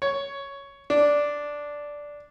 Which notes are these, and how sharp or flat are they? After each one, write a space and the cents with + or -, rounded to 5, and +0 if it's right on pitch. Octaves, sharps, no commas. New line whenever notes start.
C#5 +5
D4 -5